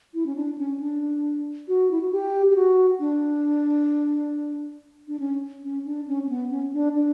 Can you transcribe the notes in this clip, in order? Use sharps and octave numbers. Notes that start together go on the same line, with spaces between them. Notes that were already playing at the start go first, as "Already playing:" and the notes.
E4
C#4
D4
C#4
D4
F#4
E4
F#4
G4
G4
F#4
D4
D4
C#4
C#4
D4
C#4
C#4
B3
C#4
D4
D4